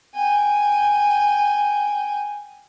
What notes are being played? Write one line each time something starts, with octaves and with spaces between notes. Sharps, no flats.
G5 G#5